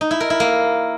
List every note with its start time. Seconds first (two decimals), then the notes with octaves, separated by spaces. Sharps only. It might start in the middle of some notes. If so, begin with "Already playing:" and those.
0.01 D#4
0.11 E4
0.20 A#4
0.30 E4
0.40 A#3